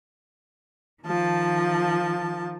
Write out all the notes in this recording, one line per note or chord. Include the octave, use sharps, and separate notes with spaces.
D#3 F3 A5